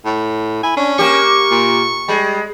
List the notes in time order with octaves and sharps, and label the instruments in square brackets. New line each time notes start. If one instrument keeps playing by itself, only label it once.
[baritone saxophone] A2
[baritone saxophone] E4 [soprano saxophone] G#5
[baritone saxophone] C#4 [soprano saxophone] D4
[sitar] A#3 G4 [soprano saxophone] C#6
[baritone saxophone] A#2
[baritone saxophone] G3 [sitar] G#3